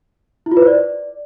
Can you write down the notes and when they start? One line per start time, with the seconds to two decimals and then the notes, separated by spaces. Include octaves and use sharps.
0.46 E4
0.51 F4
0.57 B4
0.62 C5
0.67 D5